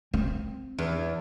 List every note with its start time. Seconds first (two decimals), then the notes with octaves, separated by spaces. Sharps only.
0.14 C4
0.78 E2